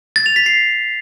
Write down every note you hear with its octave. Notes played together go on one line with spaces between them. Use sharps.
A6
F7
B6
C7